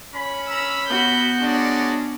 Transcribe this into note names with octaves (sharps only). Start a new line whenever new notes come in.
C#4 B5
A#5 E6
B3 F#4 G6
G#3 C#4 D4 D5